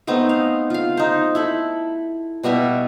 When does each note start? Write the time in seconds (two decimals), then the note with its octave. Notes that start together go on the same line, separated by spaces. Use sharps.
0.07 A3 B3 C4 D#4
0.29 F5
0.70 F4 F5
0.97 D#4 C5
1.35 E4 A4 B5
2.43 B2 G3 F#4 E5